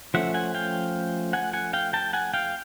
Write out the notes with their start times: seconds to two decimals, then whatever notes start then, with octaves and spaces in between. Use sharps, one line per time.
0.14 F3 A3 C#4 E5 F#5
0.34 F#5 G#5
0.54 F5 G5
1.33 F#5 G#5
1.53 F#5 G#5
1.73 F5 G5
1.93 G5 A5
2.13 F#5 G#5
2.34 F5 G5